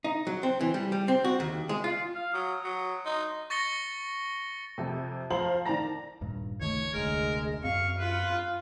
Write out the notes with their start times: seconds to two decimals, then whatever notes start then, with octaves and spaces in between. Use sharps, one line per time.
0.04 D#4
0.27 F#3
0.43 C4
0.61 E3
0.74 G3
0.92 G3
1.08 C4
1.24 F#4
1.40 D#2
1.69 G#3
1.84 F4
2.15 F5
2.34 F#3 D#6
2.64 F#3
3.06 D#4 C6
3.50 C#6 A6 A#6 C#7 G7
4.78 F2 C3
5.30 F3 C5 F5 A#5 F#7
5.65 D#3 D5 A5 A#5 A#6
6.21 D#1 G2
6.60 C#2 D#3 A3 C#5
6.94 F1 D2 G#3 A#4
7.64 F#2 C4 F5 C#6
7.99 F4 B4